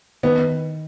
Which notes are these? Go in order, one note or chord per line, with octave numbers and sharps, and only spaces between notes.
D#3 B3